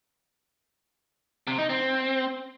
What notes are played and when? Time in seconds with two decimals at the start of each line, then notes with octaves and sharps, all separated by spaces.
1.47 C3
1.58 D#4
1.70 C4